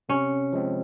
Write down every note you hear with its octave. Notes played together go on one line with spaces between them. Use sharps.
C3 C#4
F3 G#3 C4